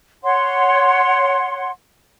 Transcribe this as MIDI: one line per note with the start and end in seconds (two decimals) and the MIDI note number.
0.23 1.69 73
0.23 1.69 78
0.23 1.69 84